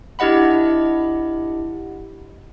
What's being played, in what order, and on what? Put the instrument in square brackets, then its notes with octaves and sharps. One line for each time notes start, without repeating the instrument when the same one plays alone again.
[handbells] D4 E4 G4 D#5 F#5 B5